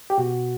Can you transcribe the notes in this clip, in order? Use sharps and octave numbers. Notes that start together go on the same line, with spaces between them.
G4
B2 F#4